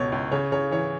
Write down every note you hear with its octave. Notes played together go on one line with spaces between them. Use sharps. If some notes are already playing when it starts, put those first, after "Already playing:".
Already playing: C#2 B2 C#5
C#2
C#3 C#5
C#3 C#5
E3 C#5